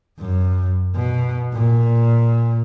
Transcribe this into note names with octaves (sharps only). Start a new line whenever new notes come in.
F#2
B2
A#2